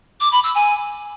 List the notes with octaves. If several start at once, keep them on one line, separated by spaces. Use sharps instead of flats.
D6
B5
E6
G#5